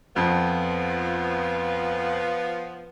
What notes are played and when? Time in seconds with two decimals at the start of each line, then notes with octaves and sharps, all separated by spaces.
0.16 F2 F3 B3